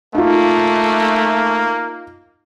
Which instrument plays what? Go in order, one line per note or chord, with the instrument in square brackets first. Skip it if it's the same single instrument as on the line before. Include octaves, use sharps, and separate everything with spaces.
[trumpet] A3 [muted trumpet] A#3 [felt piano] D#4 F4